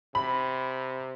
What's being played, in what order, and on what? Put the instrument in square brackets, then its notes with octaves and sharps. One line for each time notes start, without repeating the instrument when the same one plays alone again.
[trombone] C3 [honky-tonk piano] B5